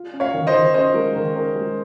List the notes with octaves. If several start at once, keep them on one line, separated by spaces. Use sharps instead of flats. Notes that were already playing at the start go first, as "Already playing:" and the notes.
Already playing: F4
C#4
C#5 F5
D#3
C5 D#5
D#3
C#4 C5 D#5
G#3 A#4
D#3 A#4
C#4 A#4
G#3